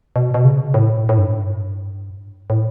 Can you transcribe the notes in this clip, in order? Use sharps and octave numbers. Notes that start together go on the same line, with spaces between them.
B2
B2
C#3
A2
A2
G2
A2